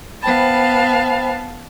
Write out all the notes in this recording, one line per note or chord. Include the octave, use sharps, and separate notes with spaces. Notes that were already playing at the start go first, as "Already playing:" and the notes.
B3 C5 F5 G5 A5 B5